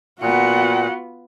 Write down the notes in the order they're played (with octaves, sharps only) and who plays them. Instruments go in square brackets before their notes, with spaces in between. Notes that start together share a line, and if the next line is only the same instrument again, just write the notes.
[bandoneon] A#2 [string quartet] B3 F4 [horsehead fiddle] F#4 F#5